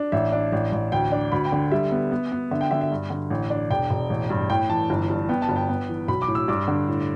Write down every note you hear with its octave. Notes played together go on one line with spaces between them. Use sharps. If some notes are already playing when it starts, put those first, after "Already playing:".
Already playing: D4
A1 E5
D4
A1
A1
D2 G5
D4
D2 B5
G5
D3
G3 E5
B3
B3
B3
D3 E5
G5
D3 E5
E5
G2
D3
A1
D4
E1 G5
E1
A1
G2
A2 G5
E3 A5
G1
G2
B3 G5
A5
G1
G5
B3
E3
B1 B5
D6
A2
E6
G2 D6
D3
A2